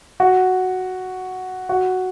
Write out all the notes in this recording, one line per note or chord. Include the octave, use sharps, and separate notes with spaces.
F#4
F#4